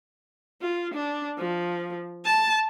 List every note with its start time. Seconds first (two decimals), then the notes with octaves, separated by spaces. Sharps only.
0.62 F4
0.94 D4
1.38 F3
2.25 A5